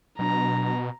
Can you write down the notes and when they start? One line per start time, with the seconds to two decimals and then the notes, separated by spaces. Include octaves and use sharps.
0.19 B2 F#3 D4 A#5